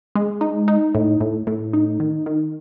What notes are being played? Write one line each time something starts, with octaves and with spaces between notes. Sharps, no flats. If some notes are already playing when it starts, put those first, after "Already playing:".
G#3
D#4
D#4
A2
A2
A2
D#4
D#3
D#3